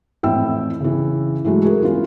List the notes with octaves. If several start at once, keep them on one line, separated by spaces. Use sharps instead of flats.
A1 F2 E4 E5 G5 E6
C#3 E3
E3 F#3 G#3 A3
F#4 G#4 A#4
E3 C#4 F4